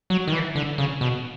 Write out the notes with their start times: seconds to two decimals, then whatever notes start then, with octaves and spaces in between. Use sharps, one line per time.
0.10 F#3
0.28 D#3
0.32 E3
0.55 D3
0.78 C#3
1.01 B2